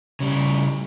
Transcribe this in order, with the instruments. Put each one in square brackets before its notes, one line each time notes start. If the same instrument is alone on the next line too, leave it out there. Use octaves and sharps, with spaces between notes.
[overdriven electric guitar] C#3 G3